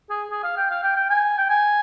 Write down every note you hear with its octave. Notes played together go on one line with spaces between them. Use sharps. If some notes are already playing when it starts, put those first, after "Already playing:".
G#4
G#4
F5
G5
F5
G5
G5
G#5
G5
G#5